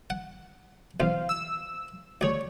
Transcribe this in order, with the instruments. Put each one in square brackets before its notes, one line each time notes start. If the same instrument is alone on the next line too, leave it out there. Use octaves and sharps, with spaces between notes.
[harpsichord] F#5
[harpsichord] B1 E2 [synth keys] C5 F5
[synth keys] E6
[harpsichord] D2 G#4 [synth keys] C#5 D5